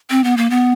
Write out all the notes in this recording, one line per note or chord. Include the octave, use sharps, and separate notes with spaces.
C4
B3
A#3
B3